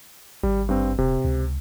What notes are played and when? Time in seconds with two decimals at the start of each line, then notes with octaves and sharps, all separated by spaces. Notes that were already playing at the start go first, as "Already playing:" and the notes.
0.43 G#1 G3
0.69 G2 C4
0.98 D#1 C3
1.25 C#2